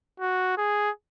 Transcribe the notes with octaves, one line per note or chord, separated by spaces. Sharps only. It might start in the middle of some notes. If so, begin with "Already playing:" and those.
F#4
G#4